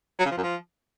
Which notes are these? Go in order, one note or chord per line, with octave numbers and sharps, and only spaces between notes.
F#3
C#3
F3
F#2
F3